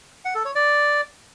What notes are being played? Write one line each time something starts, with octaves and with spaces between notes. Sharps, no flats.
F#5
A4
C#5
D5